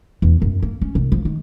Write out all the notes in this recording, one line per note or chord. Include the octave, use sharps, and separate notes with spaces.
E2
F#2
A#3
C#4
C2
F3
D#3